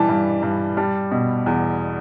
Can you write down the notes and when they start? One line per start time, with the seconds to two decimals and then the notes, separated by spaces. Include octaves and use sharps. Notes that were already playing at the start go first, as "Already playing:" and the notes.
Already playing: E3 G3 A5
0.09 G2
0.43 G2
0.77 G3 A5
1.11 B2
1.46 E2